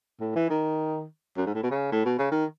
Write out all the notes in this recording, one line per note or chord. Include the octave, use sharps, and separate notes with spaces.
A2
E3
D#3
F#2
G#2
A2
B2
C#3
A2
B2
C#3
D#3